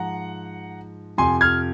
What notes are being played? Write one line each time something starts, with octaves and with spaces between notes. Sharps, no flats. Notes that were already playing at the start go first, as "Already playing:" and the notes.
Already playing: G#2 F3 F#5 A#5
F2 C3 F3 G#5 C6
F6 G#6